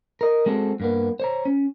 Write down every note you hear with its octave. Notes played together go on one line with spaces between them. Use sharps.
A#4 D#5
G#3 C4 F#4 A4
G2 A#3 B3
C5 C#5 A#5
C#4